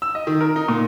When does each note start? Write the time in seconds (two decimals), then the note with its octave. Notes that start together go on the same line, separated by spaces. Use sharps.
0.02 E6
0.15 D#5
0.27 D#3
0.41 A#4
0.56 D#4
0.68 A#2